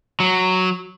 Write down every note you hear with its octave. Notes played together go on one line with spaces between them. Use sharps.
F#3